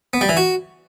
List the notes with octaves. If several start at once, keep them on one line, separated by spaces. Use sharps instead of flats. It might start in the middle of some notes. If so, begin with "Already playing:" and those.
B3
G3
E3
F#4